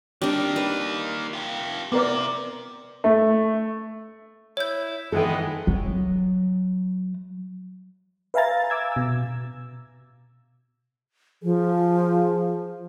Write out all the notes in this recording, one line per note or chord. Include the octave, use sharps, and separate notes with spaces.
G3 A#3 D4 D#4
B4
F4 G4
C3 B3 A#4 D5
A3
E4 C#5 G6
D#3 E3 G#3 B3 A4 D#5 G5
F#3
B4 E5 F5 G#5 A#5 A6
D6 E6 G#6
B2 E6
F3 G#4